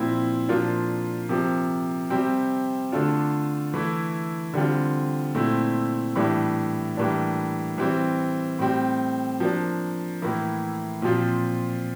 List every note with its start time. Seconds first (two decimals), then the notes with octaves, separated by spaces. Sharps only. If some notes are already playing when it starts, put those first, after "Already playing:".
Already playing: A#2 F3 C4 E4
0.49 A#2 F3 A#3 D4 F4
1.29 C3 F3 A#3
2.10 C3 G3 C4
2.92 D3 A3 D4 F4
3.74 E3 A3 E4
4.54 D3 G3 C4 F4
5.35 A#2 A3 C4 E4
6.16 A2 E3 G3 D4
6.97 A2 E3 G3 A#3 D4
7.78 E3 G3 C4
8.59 A2 G3 C4
9.40 F3 A#3 D4
10.22 A2 E3 A#3 E4
11.02 A#2 F3 C4 F4